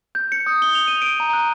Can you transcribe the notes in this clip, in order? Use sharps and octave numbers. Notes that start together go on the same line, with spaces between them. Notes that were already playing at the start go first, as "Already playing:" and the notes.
G6
C#7
D#6
G7
F7
D#7
D7
A#5
F#6